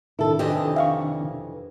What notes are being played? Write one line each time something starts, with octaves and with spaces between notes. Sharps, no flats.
C3 D#3 D4 E4 A4
F2 E3 G4 D#5
E5 F5 C#6